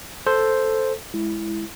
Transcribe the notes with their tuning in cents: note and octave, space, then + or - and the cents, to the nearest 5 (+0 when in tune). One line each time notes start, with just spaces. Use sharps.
A4 +0 C5 +0
G#3 +0 E4 +0